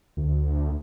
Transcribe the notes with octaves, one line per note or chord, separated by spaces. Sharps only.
D2